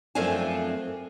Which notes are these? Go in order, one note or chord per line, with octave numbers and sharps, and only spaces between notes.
F#2 F3 A3 C4 D4 G#5